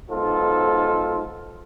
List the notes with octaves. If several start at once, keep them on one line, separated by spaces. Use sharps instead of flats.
B1 G#2 F4 A4